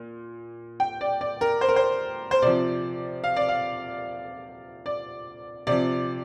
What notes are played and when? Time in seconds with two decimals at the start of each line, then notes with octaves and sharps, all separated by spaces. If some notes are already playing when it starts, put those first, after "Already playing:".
Already playing: A#2
0.80 G5
1.01 D5
1.21 D5
1.41 A#4
1.61 C5
1.69 A#4
1.76 C5
2.31 C5
2.42 C3 F3 D5
3.24 F5
3.36 D5
3.48 F5
4.86 D5
5.67 C3 F3 D5